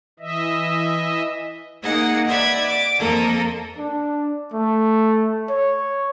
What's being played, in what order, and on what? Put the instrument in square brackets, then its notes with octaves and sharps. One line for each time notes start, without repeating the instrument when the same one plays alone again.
[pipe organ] E3 D#5 E5
[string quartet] A#3 D#4 G#4 D#5 F#5
B4 D5 E5 F#5 G#6
D6
F2 A#3 A4 A#4 D#6
[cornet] D4
A3
C#5